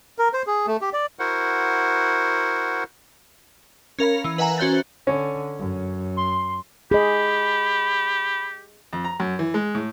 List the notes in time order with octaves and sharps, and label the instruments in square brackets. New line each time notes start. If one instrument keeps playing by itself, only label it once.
[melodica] A#4
C5
G#4
A3
G4
D5
[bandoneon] E4 F#4 A#4 C5 F#5
[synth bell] C#4 A#4 F5 B5
E3
B4 E5 F#5 G#5 A#5
C#4 F#4 C5 F#6 G6 A6
[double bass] D3 [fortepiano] C#4
[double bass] F#2
[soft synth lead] C6
[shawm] G4 [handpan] G#4 D#5 [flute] B5
[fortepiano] F2
A#5
F#2
E3
G#3
A2